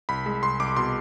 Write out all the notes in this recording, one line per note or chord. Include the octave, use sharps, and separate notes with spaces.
C2 B5
G#3
C2 C6
C2 D6
B2 C6